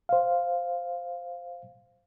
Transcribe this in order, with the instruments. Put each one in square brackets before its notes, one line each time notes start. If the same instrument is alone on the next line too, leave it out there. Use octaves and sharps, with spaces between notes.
[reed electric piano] C5 F5